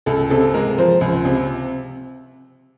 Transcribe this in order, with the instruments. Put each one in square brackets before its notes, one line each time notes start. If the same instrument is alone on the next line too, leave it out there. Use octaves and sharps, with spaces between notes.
[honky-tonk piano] C#2 A4
C3 A4
G#3 A#4
F3 C5
C#2
C3